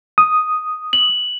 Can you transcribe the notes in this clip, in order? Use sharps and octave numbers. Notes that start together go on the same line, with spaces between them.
D#6
F#7